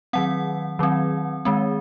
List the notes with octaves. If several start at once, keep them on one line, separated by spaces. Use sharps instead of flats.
D#3 F#3 C4 F#5
D#3 F#3 C4
D#3 G#3 C4